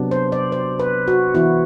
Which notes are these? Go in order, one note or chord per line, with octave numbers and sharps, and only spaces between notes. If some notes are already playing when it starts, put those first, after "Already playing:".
Already playing: C3 F#3 B3 D4
C5
D5
C5
B4
F#4
E3 B3 E4 F#4